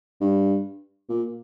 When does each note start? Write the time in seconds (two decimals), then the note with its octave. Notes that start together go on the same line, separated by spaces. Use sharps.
0.21 G2
1.09 A#2